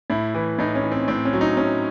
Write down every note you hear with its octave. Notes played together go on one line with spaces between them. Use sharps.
A2 E4
E3
A2 D#4
C#4
E3
C4
A2 C4
C#4
F#3
D#4
A2 C#4